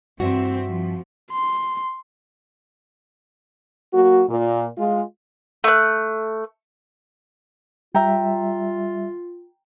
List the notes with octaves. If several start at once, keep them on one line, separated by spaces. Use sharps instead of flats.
G2 E3 C4 F#4 E5
F3
C6
F#3 A#3 F#4
A#2
G#3 F4
A3 F#6
G3 F4 E5 G5 A#5